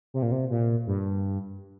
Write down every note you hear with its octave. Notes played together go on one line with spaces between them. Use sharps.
C3
A#2
C3
A#2
G2